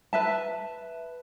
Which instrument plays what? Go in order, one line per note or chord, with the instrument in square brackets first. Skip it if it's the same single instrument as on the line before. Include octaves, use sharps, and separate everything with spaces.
[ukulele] B4 E5 A5